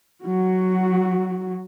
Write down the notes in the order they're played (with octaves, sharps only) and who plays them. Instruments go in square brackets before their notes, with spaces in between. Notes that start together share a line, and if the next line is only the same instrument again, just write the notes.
[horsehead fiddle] F#3 F#4